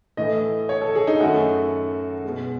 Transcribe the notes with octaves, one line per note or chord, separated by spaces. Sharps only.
A2 E3 A3 D#5
C#5
A4
G#4
D#4
F#2 D#3 A3 F#4
B2 G#3